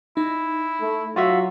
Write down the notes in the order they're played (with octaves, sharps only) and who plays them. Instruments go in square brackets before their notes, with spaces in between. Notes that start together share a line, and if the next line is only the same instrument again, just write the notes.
[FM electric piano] D#4 [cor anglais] E4
[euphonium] A3
[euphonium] F#3 [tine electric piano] F4 F#4 E5